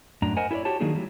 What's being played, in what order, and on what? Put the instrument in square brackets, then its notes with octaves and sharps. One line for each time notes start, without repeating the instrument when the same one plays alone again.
[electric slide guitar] F#2 A2 D4 A#5
A#4 C5 D#5 F#5 G#5
E4 G#4 A4 C#5 D5
F#4 G4 C#5 A5
D#3 F#3 A#3 D4 D#4 G#4
E3 F#3 G3